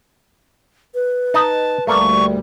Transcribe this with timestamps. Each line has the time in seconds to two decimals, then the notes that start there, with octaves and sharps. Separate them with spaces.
0.95 B4
1.34 D#4 D#5 A5
1.87 D2 G3 A3 A#3 D5 C#6